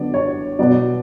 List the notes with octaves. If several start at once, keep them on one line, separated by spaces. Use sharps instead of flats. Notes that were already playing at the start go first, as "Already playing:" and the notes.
Already playing: D3 F#3 B3 D5
C#5
B2 F#3 B3 D5